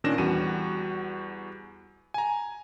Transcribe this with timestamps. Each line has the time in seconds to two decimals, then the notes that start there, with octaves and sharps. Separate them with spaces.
0.04 A#2 D#3 C#4 D4 A#6 E7
0.18 E2 G3 F#4 D#7
2.14 G#5 A#5